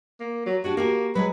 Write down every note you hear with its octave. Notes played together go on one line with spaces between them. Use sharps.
A#3
F#3
D4 F#4 G4 C#5
A#3 F#4 G4 A#4
F#3 G#3 G#4 B4